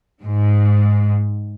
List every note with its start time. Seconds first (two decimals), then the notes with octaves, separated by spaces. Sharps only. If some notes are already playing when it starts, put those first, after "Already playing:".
0.22 G#2